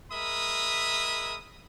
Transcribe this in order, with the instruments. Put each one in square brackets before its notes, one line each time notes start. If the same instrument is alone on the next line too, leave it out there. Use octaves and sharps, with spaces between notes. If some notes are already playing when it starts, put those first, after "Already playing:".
[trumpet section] G#3 A#4 E5 B5 D#6